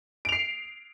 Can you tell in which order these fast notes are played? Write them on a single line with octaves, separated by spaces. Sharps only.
D7 F7 C7